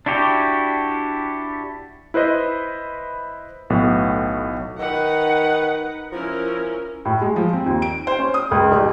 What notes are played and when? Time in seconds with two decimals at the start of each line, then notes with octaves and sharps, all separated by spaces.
0.06 D4 E4 F#4 G4
2.14 E4 B4 C5 D#5
3.70 B1 A2 B3
4.79 D#3 D#4 B4 F#5
6.12 F3 C#4 E4 A#4
7.05 A2
7.21 G#3
7.36 F3
7.53 C4
7.66 D#2
7.82 D7
8.07 C5
8.19 C#4
8.34 D#6
8.51 C#2
8.72 A1